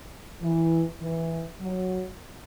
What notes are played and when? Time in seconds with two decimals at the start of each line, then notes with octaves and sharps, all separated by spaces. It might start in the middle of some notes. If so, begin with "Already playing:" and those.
0.41 E3
1.01 E3
1.60 F#3